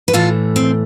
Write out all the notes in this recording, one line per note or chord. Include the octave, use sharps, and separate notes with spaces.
B4
A2 E3 A3 F4 A4
C4